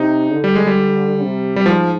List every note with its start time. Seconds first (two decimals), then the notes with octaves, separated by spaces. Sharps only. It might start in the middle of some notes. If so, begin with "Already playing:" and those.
Already playing: C3 D#4
0.33 D3
0.44 G3
0.55 G#3
0.67 G3
1.22 C3
1.56 G3
1.66 G#2 F3